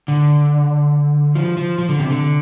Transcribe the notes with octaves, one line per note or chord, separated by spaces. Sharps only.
D3
F3
F3
F3
D3
C3
D3